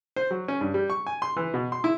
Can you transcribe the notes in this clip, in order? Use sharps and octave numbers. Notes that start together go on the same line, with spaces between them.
C5
F#3
C#4
G2
G3
C#6
G#5
C6
E3
B2
C6
E4